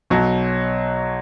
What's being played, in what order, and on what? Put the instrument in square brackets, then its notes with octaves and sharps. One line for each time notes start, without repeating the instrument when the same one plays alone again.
[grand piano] B1 B2 F#3